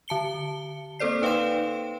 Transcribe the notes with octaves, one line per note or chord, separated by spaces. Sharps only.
D3 A5 C#7 G7
A#3 C4 A4 C5 D5 C7
D#4 B4 F5 G5 C6 E7